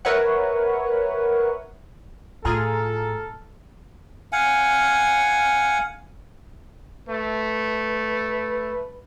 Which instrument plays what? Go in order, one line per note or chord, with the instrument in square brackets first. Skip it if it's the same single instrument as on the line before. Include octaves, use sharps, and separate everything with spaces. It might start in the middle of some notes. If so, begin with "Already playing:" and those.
[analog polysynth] A#4 B4 C#5 E5 F#5
[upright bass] A2 [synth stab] F4 G#4 [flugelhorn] A4 [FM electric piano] A5 A#5 F6
[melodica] F5 F#5 G#5
[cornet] A3 [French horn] B4